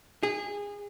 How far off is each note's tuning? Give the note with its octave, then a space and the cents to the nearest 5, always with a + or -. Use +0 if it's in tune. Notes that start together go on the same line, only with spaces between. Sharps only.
G#4 -25